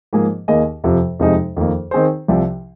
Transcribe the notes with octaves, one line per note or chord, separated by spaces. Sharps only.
G#2 F3 A#3 G#4
D#2 D#3 A#3 G#4 D#5
F2 C3 F3
F2 C3 F3 G#3 D#4
F2 D#3 A#3
D#3 C4 G#4 C5
C2 C3 F3